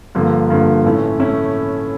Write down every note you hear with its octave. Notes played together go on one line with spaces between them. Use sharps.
G2 D3 F3 A#3
G2 D3 F3 A#3
A2 E3 A3 C#4 E4
A2 E3 A3 C#4 E4